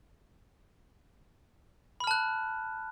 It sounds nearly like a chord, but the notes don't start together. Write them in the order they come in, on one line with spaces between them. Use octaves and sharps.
B5 F6 A5 F#6